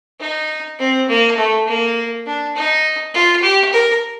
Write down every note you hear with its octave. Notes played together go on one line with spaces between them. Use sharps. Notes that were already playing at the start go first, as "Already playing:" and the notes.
D#4
C4
A#3
A3
A#3
D4
D#4
F4
G4
A#4